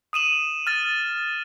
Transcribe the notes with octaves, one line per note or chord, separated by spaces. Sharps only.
D#6 D#7 E7 F#7
F6 A6